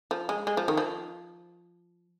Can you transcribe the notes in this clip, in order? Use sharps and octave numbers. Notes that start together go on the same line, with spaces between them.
F3
G#3
G#3
F3
D#3
F3